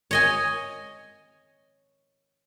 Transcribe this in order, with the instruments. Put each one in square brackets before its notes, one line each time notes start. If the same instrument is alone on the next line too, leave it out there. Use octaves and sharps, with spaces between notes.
[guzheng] C#5 D#5 G#5